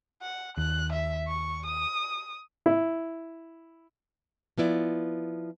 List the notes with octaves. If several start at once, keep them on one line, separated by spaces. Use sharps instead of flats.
F#5
D#2 F#6
E5
C#6
D#6
E4
F3 B3 E4 D5